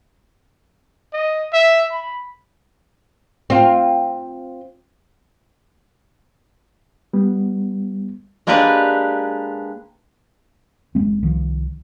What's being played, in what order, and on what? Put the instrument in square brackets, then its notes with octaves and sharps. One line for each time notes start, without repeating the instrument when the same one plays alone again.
[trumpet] D#5
E5
B5
[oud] C4 F4
[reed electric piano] G3 B3
[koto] G#3 A#3 D4 G4 A#4 B4
[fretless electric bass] F#1 G#2 G#3 C4
C2 D#3 F3